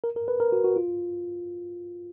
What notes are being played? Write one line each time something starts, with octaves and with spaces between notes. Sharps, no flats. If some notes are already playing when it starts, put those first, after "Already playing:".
A#4
A#4
B4
A#4
F#4
F#4
F4